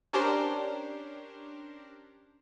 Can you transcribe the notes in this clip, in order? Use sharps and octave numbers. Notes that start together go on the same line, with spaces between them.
C#4 D4 G4 A#4 C5